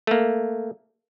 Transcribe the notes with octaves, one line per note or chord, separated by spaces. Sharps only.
A3 A#3